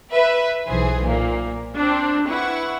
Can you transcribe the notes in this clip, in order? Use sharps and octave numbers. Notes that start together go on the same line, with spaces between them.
B4 E5
B1 E3 G#4 C5
A#2 A#3
C4 D4
E4 B4 F#5 C#6